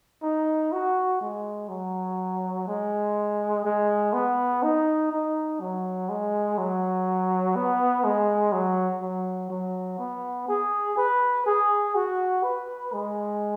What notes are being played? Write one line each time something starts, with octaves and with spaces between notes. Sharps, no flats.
D#4
F#4
G#3
F#3
G#3
G#3
B3
D#4
D#4
F#3
G#3
F#3
B3
G#3
F#3
F#3
F#3
B3
G#4
B4
G#4
F#4
B4
G#3